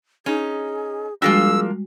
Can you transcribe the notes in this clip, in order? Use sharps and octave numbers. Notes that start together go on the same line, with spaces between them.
C#4 D#4 G#4
F3 G3 G#3 A#3 D4 F#4 G#4 E6